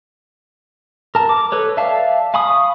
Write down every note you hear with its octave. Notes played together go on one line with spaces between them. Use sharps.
A#4 A5
D6
A4 B4 C#5
D5 E5 F5 A5
F5 G#5 B5 C#6 D#6